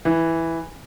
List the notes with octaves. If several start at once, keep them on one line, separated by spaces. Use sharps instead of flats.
E3